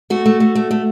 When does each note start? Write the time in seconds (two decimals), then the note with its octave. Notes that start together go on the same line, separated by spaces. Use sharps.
0.10 A3 F#4
0.26 A3
0.40 A3
0.55 A3
0.71 A3